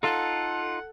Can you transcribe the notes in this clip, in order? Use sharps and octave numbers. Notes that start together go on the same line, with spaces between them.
D#4 F4 A4 F#5